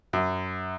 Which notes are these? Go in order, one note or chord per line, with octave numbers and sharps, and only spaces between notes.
F#2